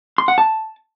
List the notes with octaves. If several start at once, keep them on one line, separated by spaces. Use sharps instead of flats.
C6
F#5
A5